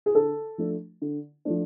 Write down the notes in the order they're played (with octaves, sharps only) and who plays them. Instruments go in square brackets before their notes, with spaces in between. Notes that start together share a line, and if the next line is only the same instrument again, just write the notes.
[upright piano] G#4
D3 A4
F3 A3 D4
D3
F3 A3 D4